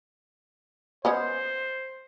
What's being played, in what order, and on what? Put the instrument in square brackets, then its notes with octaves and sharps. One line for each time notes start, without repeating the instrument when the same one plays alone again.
[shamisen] G#3 B3 C#4 [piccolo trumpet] C5